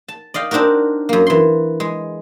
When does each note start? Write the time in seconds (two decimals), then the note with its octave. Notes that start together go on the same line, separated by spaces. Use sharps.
0.08 A5
0.34 D5 D#5 F5 G5
0.51 C4 D4 D#4 F#4 A#4
1.09 F#2 A#3
1.27 E3 C6
1.80 G#3